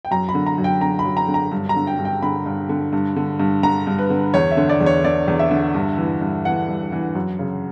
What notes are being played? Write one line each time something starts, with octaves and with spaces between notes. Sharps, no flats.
G5
F#2 A#5
B5
D3
A#5
F#2
G5
D3 A#5
B5
F#2
A#5
D3
A#5
G2
A#5
D3
G5
G2
G5
D3 B5
G2
D3
G2
D3
G2
D3 A#5
G2
B4
D3
E2 C#5
E5
D3
D5
E2
C#5
D3 D5
E2
E5
D3
G2
E3
G2
E3 F#5
G2
E3
F#2
C#3